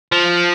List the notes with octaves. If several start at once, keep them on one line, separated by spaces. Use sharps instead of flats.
F3